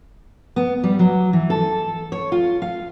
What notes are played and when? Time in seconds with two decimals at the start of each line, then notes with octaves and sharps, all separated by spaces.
0.56 B3
0.83 G3
0.99 F#3
1.33 E3
1.50 A4
2.12 C#5
2.32 F4
2.62 F5